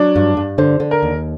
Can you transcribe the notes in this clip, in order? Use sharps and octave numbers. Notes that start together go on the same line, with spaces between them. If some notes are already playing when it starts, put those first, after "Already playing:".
Already playing: F#3 D4
G2
G2
D3 C5
D3
A#4
D#2